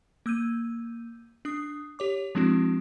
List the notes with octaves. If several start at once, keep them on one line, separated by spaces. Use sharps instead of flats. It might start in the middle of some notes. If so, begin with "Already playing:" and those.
A#3 E6 G6 D#7
D4 D#6
G4 C#5 D6
F3 G#3 C4 D4 E4 F#4